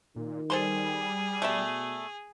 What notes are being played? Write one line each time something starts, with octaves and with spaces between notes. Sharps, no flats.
A#2 D#3
G3 G#4 A4 C5 C6
B2 A3 D5 E5